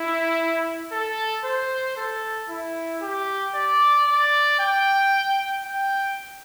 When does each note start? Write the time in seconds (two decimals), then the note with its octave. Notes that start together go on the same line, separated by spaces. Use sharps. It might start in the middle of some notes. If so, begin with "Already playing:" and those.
Already playing: E4
0.92 A4
1.44 C5
1.97 A4
2.49 E4
3.02 G4
3.55 D5
4.07 D5
4.60 G5
5.65 G5